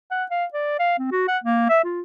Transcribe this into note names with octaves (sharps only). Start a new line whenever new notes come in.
F#5
F5
D5
F5
C4
F#4
F#5
A#3
E5
F4